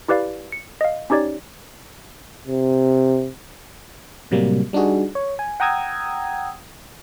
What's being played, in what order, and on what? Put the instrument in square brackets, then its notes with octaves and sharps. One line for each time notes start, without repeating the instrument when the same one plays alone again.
[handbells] E4 G4 B4 D5 F5
C#7
D#5 F5
C#4 D#4 G4 C#5 D5
[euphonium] C3
[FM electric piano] A2 C3 F#3 G3 A#3
G3 D4 D#4 F#4 G#4
C#5
G#5
F#5 G5 A#5 D#6 E6 G#6